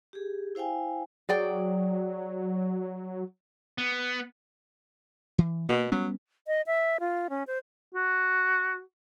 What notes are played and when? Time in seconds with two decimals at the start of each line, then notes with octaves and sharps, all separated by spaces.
0.13 G4 G#4
0.55 E4 C5 F5 G5 G#5
1.29 F#3 G#4 D5 G5
3.78 B3
5.38 E3
5.69 B2 A#3
5.92 F#3 G3 B3 C#4
6.47 D#5
6.67 E5
7.00 F4
7.30 C#4
7.47 C5
7.95 F#4